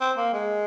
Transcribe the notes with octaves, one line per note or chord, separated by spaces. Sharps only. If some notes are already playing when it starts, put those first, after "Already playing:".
C4
A#3
G#3